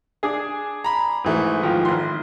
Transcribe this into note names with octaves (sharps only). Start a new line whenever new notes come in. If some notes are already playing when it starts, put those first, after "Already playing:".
D4 G#4
A#5 B5
G#2 E3 A3
D#3 F3
G#1 C6